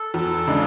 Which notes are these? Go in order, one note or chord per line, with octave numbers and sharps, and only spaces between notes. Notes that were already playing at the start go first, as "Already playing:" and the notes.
Already playing: A4
E2
C#3 G#3 D4